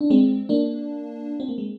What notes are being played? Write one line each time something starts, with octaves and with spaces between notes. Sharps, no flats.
D4
G#3 C4
A#3 D4
C4
A#3
G#3